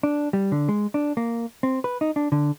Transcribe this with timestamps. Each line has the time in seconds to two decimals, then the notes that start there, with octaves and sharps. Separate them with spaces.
0.03 D4
0.33 G3
0.52 D3
0.69 G#3
0.94 D4
1.17 A#3
1.63 C4
1.84 B4
2.01 D#4
2.16 D4
2.32 D3